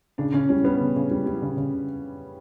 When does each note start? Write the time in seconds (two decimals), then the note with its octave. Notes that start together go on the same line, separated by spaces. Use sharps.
0.18 C#3 D4
0.34 C#3 C#4
0.49 G3 C#4
0.64 G3 B3
0.80 C#3
0.96 C#3
1.11 G3
1.26 G3
1.42 C#3
1.57 C#3